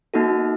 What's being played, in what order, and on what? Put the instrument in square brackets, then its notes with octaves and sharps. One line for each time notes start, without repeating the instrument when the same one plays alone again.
[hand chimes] A#3 D#4 F#4 A4